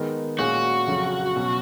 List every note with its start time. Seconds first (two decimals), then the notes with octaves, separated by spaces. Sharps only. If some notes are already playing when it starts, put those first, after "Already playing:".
Already playing: D#3 G#3 B3 D#4 A#4
0.39 A#2 G#3 C#4 F#4 G#4
0.87 F2 C#3 F#3 C#4
1.36 B2 F#3 C#4